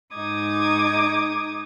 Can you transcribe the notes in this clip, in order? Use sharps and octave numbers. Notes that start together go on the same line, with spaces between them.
G#2 D#4 D6 D#6 G#6